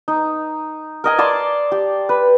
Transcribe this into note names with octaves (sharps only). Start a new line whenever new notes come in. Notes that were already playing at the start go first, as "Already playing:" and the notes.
D#4
A#4 D#5 G#5
D5 A5 C6 D6
G4
B4